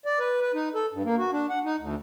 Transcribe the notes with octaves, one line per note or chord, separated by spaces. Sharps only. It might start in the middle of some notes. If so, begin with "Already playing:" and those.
D5
B4
B4
D#4
A4
G2
A#3
F#4
D4
F#5
D#4
D2